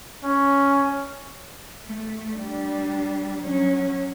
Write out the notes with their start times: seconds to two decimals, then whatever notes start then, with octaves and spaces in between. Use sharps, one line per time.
0.24 C#4
1.85 A3
2.35 G3 D4
3.43 F#3 C#4